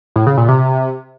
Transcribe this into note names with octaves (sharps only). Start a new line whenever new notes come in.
A2
C#3
A#2
C3